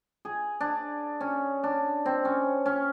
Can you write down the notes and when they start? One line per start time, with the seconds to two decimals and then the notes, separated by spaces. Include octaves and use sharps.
0.25 G#4
0.60 D4
1.21 C#4
1.63 D4
2.05 C4
2.25 C#4
2.66 C#4